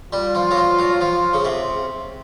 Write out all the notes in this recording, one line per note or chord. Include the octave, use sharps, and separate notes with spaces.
G3 F4
F3
F#3
F3
F#3
F3
C#3
C3